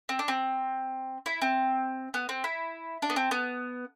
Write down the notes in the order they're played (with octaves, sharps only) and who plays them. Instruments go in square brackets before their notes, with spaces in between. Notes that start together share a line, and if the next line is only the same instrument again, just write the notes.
[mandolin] C4
D4
C4
E4
C4
B3
C4
E4
D4
B3
C4
B3